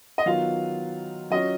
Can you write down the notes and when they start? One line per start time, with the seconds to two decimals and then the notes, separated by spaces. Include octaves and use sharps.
0.18 D#5
0.26 D#3 F#3 B3 F4 F5
1.30 F#3 C#4 F4 D#5